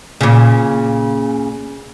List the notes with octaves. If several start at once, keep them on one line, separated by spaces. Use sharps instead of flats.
A#2 C#3